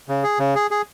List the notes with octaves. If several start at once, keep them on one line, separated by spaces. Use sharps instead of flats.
C#3
G#4
C#3
G#4
G#4